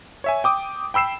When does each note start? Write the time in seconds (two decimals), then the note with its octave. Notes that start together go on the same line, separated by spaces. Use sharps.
0.24 C#5 E5 G#5
0.44 G5 D6 D#6
0.94 G5 B5 E6 C7 E7